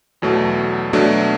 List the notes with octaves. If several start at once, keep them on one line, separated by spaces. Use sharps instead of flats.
E2 B2 F#3 A3
B2 F#3 A3 D4